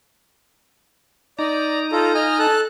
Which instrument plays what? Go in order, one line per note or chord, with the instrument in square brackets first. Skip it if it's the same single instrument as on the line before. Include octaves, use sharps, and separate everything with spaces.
[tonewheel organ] D#4 A#5 [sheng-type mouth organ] D5
[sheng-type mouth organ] F4 A4
D#5 G#5 F6
A4 A5 F#6